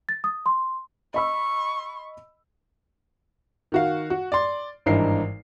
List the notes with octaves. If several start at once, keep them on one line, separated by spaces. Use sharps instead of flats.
A6
D#6
C6
D#5 B5 C#6 E6
D#3 F#4 F5
F#4
D5 C6
G#1 G2 E3 D#4 A#4 C7